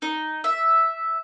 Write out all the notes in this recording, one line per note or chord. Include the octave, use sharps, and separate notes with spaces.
D#4
E5